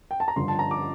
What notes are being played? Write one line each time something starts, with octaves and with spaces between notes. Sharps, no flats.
G5
A5
A#5
G1 G2 D3 F3 C6
A5
A#5
D6